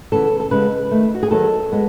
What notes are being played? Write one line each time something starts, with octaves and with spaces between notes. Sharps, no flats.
C#3 E3 B3 A4
A4
C#3 G#3 B3 B4
D#3 A3
F#4
G#4
D#3 F#3 B3 A4
G#3 B3